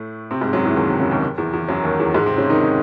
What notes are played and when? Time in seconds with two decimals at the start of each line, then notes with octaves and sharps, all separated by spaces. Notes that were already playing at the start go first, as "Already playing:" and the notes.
Already playing: A2 A3
0.31 C3 C4
0.41 G#2 G#3
0.53 F#2 F#3
0.65 E2 E3
0.76 D#2 D#3
0.88 C3
1.00 C#3
1.10 D#2 D#3
1.37 E2 E3
1.53 E2 E3
1.68 F#2 F#3
1.83 D#2 D#3
2.00 E2 E3
2.15 G#2 G#3
2.26 C3 C4
2.38 C#3 C#4
2.50 D#3 D#4
2.61 D#3 D#4